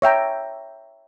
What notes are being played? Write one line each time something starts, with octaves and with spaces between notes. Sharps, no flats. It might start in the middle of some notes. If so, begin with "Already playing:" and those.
C#5 E5 G5 A#5